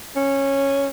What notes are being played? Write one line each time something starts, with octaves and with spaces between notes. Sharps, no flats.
C#4